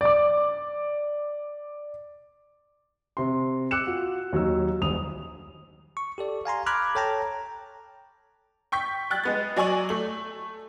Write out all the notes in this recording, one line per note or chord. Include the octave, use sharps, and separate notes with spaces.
D5 D6
C3 C6
D6 E6 F#6 C#7 E7
F4 F#4
D#2 F#3 D#4 E6
D#1 A#1 G3 D#6 F7
C#6
G4 A4 D5
F5 G#5 A#5 C6
A#5 B5 D6 F6 F#6 G#6
A4 C#5 G5 A5 A#5
G5 C#6 G6 B6
G5 F#6 A6
G#3 B3 A6
F#3 D5 G#5 C#6 F#7
A3 F#7